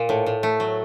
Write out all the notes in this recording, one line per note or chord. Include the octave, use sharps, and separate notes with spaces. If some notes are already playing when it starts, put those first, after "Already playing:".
Already playing: A#2
A2
A2
A3
F#3